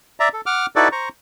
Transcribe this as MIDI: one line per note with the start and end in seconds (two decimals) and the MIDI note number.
0.20 0.29 74
0.20 0.29 76
0.20 0.29 82
0.33 0.41 69
0.46 0.66 78
0.46 0.66 86
0.46 0.66 89
0.76 0.88 63
0.76 0.88 64
0.76 0.88 66
0.76 0.88 69
0.76 0.88 71
0.76 0.88 74
0.92 1.09 72
0.92 1.09 82
0.92 1.09 85